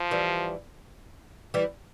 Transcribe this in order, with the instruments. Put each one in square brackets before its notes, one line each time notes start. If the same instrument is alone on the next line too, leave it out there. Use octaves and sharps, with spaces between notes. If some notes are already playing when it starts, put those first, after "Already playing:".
Already playing: [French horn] F3
[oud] E3 G3
E3 G3